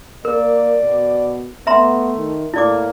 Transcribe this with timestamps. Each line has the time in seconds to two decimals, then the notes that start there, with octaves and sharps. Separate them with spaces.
0.25 A#3 A#4 D5
0.81 B2
1.67 A3 B3 E5 A#5 C6
2.17 D#3
2.54 A2 A#3 E4 D5 D6